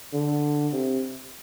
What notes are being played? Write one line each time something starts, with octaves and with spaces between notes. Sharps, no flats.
D3
C3